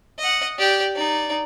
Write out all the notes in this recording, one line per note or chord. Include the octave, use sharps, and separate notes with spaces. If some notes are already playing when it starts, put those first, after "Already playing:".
D#5 F#5
G4 D5
D#4 D5